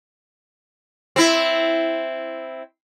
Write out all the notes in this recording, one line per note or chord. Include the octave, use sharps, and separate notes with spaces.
C4 E4